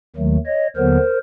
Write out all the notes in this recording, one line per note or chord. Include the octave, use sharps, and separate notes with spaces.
D#2 D#3 F#3 A3
C#5 D#5
D#2 D3 F#3 B3 A#4 C5